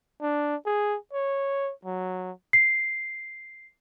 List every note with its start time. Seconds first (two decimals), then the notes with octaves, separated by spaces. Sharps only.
0.21 D4
0.66 G#4
1.13 C#5
1.85 F#3
2.53 C7